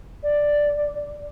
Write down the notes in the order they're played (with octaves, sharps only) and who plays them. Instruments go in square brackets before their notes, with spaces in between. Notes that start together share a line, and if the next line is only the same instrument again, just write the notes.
[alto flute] D5